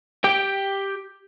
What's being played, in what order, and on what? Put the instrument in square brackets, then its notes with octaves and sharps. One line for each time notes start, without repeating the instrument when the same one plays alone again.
[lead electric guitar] G4 G5